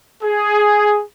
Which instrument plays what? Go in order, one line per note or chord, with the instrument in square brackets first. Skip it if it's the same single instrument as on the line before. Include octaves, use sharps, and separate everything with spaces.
[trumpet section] G#4